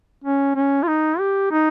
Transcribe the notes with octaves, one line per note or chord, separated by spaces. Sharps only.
C#4
C#4
F4
D#4
G4
D#4